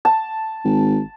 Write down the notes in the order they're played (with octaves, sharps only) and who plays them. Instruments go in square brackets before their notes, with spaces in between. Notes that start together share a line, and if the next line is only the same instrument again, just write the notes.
[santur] A5
[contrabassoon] G#1